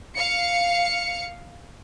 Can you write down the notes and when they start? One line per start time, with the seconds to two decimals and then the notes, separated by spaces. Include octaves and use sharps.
0.16 F5 C#7